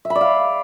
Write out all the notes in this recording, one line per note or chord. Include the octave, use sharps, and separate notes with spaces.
E5
B5
D5
F5